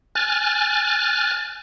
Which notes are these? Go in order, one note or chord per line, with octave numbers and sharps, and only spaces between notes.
G#5 F6 F#6 A6